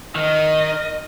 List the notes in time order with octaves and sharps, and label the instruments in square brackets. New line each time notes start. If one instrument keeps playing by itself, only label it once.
[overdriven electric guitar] D#3 [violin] D#5